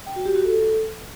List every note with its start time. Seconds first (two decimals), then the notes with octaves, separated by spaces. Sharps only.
0.07 G5
0.16 F#4
0.25 G4
0.35 F#4
0.44 A4